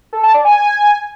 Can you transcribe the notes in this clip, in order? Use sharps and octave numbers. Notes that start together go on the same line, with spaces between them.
A4
A5
D5
G#5